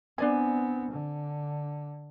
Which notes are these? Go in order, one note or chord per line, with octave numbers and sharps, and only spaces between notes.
B3 C4 D4 D5 G#5
D3